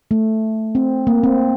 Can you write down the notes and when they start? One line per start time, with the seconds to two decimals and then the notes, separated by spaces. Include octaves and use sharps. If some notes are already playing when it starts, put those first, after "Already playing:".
0.11 A3
0.75 C4
1.07 A#3
1.23 C4